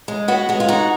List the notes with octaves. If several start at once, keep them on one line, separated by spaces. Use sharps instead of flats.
G#3
B3 F#4
G#3 G#4
F4
D#4 F#4